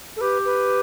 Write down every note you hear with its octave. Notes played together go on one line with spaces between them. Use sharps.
A4
G4 B4
B4